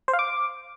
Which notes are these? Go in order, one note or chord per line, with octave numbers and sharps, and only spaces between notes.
C5
F5
D6